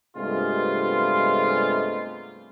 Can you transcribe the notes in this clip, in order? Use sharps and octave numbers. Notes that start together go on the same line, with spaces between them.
G2 C3 G#3 A3 B3 F4